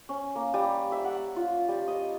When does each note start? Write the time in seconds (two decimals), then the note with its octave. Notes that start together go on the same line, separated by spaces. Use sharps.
0.09 C#4
0.35 A#3
0.54 G3
0.92 E5
1.04 F#5
1.36 F4
1.68 G3
1.88 D#5